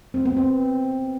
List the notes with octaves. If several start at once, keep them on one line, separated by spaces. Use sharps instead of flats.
C4
B3
C4